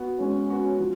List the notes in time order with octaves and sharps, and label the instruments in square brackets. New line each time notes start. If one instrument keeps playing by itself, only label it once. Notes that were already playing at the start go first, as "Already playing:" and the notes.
Already playing: [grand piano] B3 F#4
[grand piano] G#3 [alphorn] C#4
[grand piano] B3 F#4
F3